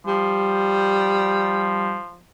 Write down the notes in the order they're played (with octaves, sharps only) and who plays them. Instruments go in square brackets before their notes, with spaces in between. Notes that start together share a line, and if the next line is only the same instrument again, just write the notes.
[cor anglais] F3 [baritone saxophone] G3